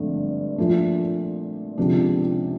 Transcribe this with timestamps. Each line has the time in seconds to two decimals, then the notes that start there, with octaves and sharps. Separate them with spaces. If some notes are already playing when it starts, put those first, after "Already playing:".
Already playing: G#1 G2 D3 F3 A3
0.58 A#2 F3 A3 D4
1.78 C#2 C3 F3 A#3 D4